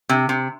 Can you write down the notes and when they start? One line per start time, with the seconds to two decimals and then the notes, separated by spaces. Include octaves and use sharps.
0.09 C3
0.29 C3